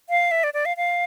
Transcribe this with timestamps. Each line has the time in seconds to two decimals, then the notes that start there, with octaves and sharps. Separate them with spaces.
0.09 F5
0.31 E5
0.44 D5
0.54 D5
0.65 F5
0.77 F5